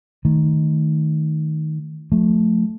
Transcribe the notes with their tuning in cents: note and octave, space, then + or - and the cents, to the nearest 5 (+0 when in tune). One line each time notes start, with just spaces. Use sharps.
D#3 +0 A3 +0
F3 +30 A3 -10